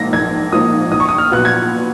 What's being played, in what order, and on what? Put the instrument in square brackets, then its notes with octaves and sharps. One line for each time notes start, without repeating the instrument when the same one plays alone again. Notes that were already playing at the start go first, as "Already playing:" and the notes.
Already playing: [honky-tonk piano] A#1 G#2 F3 A#3 [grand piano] A#6
[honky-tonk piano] A#1 [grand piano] G#6
[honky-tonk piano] G#2 F3 A#3 [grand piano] D#6
[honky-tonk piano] A#1 [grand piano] D#6
[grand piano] C#6
D#6
F6
[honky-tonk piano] A#2 F#3 B3 [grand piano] F#6
[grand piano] G#6